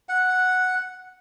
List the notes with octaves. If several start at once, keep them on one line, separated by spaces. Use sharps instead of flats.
F#5